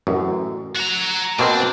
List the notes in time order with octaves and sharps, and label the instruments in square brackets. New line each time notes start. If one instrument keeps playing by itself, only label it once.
[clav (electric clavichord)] A1 F#2
[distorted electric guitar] F#4 A#5
[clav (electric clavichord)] B2 A#3 C4 [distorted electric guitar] D4